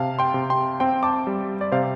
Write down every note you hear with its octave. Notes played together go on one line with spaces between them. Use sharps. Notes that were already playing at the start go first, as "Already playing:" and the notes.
Already playing: C3 F5 A5
G5 C6
C3
G5 C6
C4 G5 C6
A5 D6
G3
D5
C3 C5 F5